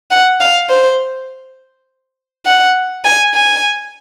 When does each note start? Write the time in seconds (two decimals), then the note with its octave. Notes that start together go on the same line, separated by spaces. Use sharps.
0.11 F#5
0.41 F5
0.70 C5
2.46 F#5
3.05 G#5
3.34 G#5